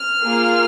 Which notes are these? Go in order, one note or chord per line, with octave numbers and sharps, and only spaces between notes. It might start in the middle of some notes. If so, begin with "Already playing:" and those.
Already playing: F6
A#3 F4 G#4